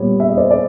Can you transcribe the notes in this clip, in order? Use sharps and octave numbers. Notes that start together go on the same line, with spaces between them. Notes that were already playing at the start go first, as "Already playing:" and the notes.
Already playing: A#2 G3 B3 C#5
E5
D#5
C5 D5
D5